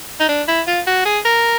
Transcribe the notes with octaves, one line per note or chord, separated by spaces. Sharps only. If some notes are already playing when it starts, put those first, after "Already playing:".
D#4
D4
E4
F4
F#4
G#4
A#4